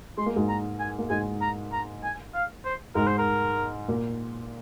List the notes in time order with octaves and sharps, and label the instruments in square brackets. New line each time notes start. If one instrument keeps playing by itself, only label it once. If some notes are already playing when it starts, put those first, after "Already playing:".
[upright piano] G#3 [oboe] C6
[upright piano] A#3
G#2 G#3
[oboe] A#5
G#5
[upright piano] A#3
[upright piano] G#2 G#3 [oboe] G#5
[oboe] A#5
A#5
G#5
F5
C5
[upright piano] G#2 G#3 [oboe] A#4
[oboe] C5
A#4
[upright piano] A#2 A#3